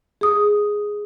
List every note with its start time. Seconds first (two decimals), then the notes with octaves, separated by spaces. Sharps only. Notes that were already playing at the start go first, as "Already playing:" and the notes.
0.21 G#4 D#6